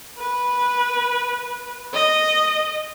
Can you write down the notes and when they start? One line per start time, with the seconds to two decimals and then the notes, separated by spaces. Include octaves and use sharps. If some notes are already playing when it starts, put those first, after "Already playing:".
0.18 B4
1.93 D#5